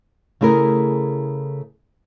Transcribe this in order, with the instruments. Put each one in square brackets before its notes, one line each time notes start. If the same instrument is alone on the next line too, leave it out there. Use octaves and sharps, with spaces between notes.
[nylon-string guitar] C#3 A3 E4 G#4 A#4